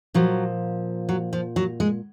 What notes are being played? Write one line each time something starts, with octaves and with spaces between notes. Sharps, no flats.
A#2 F3 F#3
F#3
F3
F#3
G#3